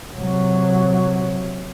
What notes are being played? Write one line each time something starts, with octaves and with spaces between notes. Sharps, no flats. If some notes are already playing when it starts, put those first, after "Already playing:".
C3 F#3